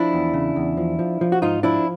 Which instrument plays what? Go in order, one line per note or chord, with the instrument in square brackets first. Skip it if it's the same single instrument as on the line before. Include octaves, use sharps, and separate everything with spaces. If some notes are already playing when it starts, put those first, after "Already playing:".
Already playing: [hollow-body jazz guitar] F3 D4 E4
E2
C#3
E2
F3
F3
F3
F#4
G#2 D#4 F4
F3 D4 E4